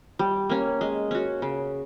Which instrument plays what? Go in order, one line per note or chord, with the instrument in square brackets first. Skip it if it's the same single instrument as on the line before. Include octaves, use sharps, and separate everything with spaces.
[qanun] G3
A#3 C#4
G#3
C#4 F#4
C#3